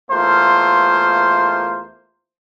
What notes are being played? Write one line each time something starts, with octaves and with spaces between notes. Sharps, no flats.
E2 A3 A#3 F4 C5